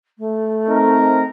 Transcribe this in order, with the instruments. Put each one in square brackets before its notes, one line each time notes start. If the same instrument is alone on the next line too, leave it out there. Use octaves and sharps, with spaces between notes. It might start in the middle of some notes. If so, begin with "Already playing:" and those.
[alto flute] A3
[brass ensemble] C4 D#4 A#4